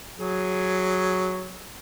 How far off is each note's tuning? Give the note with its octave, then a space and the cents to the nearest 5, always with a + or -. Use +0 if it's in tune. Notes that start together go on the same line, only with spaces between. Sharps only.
F#3 +0 G#4 +0